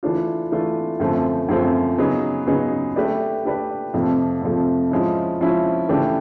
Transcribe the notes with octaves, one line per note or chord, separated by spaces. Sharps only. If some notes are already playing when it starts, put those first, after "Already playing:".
E3 A3 D4 F4
E3 A3 D4 F4
F#2 D3 F3 A3 C4
F#2 D3 F3 A3 C4
C#3 F#3 B3 D#4 G#4
C#3 F#3 B3 D#4 G#4
A3 D4 G4 B4 D5
A3 D4 G4 B4 D5
F2 C3 F3 A3
F2 C3 F3 A3
F3 G#3 C#4 E4
F3 G#3 C#4 E4
C#3 E3 A3 D4 G4